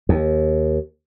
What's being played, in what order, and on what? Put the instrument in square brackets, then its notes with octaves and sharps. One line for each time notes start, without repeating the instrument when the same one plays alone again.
[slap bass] D#2